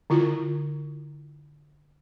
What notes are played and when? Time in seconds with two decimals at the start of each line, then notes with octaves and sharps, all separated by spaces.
0.10 D3 E4 F4